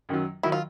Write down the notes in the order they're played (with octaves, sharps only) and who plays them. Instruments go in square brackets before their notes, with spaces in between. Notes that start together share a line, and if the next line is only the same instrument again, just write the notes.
[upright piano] F#2 D#3 F#3
[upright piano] D#3 F#3 [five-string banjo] E4
[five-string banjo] F4